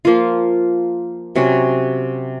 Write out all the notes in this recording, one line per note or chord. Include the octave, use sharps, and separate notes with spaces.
F3 A#3 F4
C3 F#3 C#4 F#4